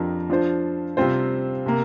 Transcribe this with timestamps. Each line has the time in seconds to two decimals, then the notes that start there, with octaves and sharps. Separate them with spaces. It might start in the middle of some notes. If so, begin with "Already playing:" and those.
Already playing: F2 F3 D4 G4 A#4
0.30 F3 D4 F4 C5
0.97 C3 G3 C4 F4 C5
1.66 C3 A#3